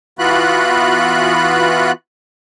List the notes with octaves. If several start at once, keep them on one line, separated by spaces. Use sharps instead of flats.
E3 B3 F4 F#4 B5 F#6